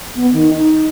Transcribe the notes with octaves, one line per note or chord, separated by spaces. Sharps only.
B3
D#3
D#4